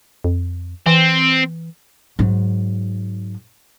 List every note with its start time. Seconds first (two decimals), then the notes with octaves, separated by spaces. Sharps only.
0.24 F2
0.86 E3 C4
2.19 G#2 F#3